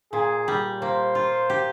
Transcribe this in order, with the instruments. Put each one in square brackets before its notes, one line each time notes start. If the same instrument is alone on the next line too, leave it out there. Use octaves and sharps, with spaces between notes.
[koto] A#2 [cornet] G#4
[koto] G3
[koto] A#3 [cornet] C5
[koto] F4
G4